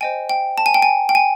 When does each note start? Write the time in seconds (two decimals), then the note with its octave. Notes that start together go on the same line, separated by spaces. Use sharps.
0.01 C5 D#5 G5 G#5
0.29 G5
0.58 A5
0.66 G#5
0.74 G5
0.82 G#5
1.09 G5
1.15 G#5